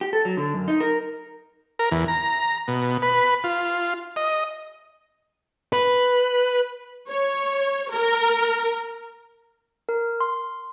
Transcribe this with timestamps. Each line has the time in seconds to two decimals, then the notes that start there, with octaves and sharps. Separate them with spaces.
0.01 G4
0.13 A4
0.25 F#3
0.37 D3
0.54 F#2
0.68 D#4
0.80 A#4
1.79 A#4
1.91 E2
2.08 A#5
2.68 B2
3.02 B4
3.44 F4
4.16 D#5
5.73 B4
7.08 C#5
7.92 A#4
9.89 A#4
10.21 C6